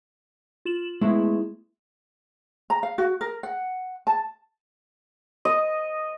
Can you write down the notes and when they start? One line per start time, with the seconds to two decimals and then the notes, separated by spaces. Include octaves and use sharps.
0.65 F4 E7 F#7
1.01 G#3 A3 B3 E4
2.70 A#5
2.83 F5
2.98 F#4
3.21 A#4
3.43 F#5
4.07 A5
5.45 D#5